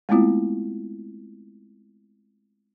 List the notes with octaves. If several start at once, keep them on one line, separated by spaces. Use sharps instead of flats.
G#3 A3 B3 C4 E4 F4